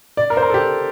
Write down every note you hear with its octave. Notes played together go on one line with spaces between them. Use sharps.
D5
A#4
C5
A#4
A4
G4